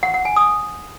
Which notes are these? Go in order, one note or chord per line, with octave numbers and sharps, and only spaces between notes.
F#5
F#5
G#5
D#6